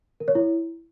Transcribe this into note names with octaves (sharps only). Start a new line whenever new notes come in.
A#4
C#5
E4